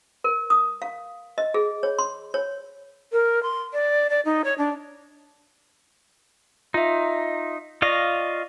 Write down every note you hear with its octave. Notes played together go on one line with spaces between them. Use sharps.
A#4
D#6
F5
D#5
G#4
C#5
C6
C#5
A#4
C6
D5
D5
D#4
C#5
D4
D#4 F4 E5
F4 D5 D#5 F5 C#6 A#6